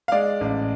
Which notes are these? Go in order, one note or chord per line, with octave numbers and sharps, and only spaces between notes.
F5
G#3 D5
A1